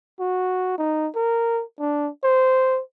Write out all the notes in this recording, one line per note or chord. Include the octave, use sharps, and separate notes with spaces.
F#4
D#4
A#4
D4
C5